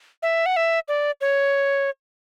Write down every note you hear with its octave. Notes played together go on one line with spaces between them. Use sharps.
E5
F#5
E5
D5
C#5